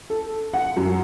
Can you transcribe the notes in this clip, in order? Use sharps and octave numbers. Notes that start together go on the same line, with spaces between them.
A4
F#5
F#2